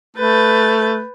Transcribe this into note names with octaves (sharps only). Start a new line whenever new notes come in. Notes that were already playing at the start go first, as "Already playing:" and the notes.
A3 B4 G6 A6